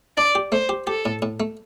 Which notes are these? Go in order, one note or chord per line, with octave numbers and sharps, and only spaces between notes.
D4 D5
G4
A3 C5
G4
G4 A4
A2
A2
A3